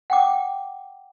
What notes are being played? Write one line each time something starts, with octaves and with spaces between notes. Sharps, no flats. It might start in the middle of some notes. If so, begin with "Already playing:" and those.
F#5 G5 D6